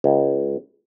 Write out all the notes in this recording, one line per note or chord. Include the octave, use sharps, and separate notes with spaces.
C#2